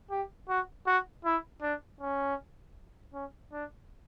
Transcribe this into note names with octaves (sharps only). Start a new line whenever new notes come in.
G4
F#4
F#4
E4
D4
C#4
C#4
D4